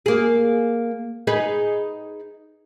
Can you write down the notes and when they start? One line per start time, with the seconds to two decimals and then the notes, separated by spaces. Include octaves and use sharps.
0.06 A#3 G#4
1.27 D#4 G#4 B4